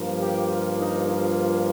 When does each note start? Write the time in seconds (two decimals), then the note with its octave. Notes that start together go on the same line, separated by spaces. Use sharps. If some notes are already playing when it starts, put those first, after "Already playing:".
Already playing: G2 F3 A#3
0.19 G4
0.49 F4
0.78 D#4
1.07 F4